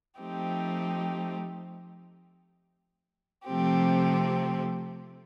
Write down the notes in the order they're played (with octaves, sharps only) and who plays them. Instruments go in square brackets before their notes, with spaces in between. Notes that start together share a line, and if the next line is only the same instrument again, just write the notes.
[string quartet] F3 A3 C4 D#4 G4
C3 F3 A3 C4 G4